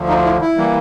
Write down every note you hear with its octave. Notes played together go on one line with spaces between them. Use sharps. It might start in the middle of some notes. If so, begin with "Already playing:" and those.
Already playing: D2 D3 F3
D#4 F4
E4
E4
E3 G3 A#3